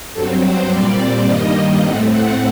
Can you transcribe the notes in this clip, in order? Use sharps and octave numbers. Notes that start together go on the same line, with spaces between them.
G2 F#3 C4 A4
C5
A#2 G3 C4 D5
G2 D#3 G3 A#3 D#5
A2 A3 C4 F#5
F#5